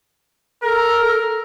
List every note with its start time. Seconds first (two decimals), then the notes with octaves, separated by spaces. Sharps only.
0.63 A4 A#4